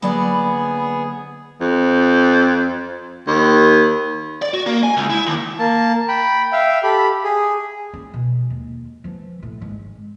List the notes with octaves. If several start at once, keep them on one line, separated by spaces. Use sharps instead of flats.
D3 F#3 A#3 B3 G#4 D5 F#5 B5
F2
D#2
D5
F#4
A#3
G#5
C#2
E4
D#2
A#3 A5
G5 B5
E5 F5 G5
G4 A4 B5
G#4
C#4
B2
D#2
E3 F3
A2
G#1